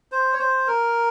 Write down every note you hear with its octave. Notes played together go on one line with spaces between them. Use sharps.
C5
C#5
C5
A#4